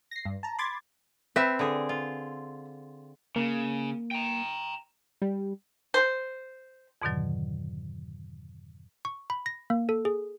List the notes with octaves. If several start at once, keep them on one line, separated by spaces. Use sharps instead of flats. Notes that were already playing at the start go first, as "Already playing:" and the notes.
A#6 C7
G2
A5 A#5
B5 C6 D6 G#6 A6
C4 B4 E5
D3 G#4
F4
C#3 A#3
G5 A#5
G3
C5
F2 G#2 B2 D3 D#3 F#3
C#6
B5
A#6
A#3
A4
G#4